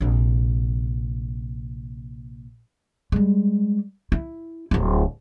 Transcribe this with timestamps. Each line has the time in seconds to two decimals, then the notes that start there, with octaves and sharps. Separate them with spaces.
0.01 A#1 C3
3.12 G3 G#3
4.12 E4
4.71 D1 E4